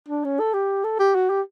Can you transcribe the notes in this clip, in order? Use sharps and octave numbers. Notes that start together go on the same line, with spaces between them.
D4
C#4
A4
G4
A4
G4
F#4
G4